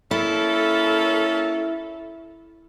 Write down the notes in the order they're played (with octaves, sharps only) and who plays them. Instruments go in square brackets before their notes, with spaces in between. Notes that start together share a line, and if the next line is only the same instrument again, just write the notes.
[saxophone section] A#3 C#4 A4 [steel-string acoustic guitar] E4